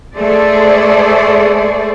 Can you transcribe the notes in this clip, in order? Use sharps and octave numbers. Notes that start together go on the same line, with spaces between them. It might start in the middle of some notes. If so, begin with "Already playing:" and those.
A3 G#4 A4 C5 D5